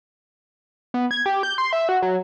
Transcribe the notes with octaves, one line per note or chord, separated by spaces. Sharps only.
B3
G#6
G4
G6
C6
E5
F#4
F#3